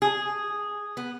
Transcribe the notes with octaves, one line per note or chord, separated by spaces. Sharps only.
G#4
B3